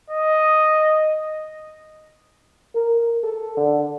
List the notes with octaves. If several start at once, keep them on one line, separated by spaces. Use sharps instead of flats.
D#5
A#4
A4
D3